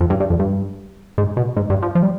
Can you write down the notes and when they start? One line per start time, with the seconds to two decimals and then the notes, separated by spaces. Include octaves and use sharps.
0.01 F2
0.10 G2
0.20 G2
0.30 F2
0.39 G2
1.18 G#2
1.37 B2
1.56 G#2
1.70 G2
1.82 F3
1.95 F3
2.03 G3